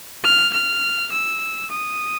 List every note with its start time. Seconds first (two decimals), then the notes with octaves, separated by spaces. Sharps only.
0.24 F6
0.53 F6
1.12 E6
1.71 D#6